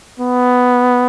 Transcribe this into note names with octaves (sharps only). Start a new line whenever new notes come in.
B3